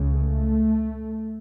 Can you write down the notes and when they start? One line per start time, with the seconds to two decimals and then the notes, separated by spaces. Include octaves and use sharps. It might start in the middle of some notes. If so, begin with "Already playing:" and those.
Already playing: C#2 C#3
0.14 A3